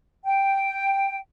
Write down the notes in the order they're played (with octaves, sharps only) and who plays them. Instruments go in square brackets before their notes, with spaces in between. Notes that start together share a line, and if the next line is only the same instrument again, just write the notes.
[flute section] G5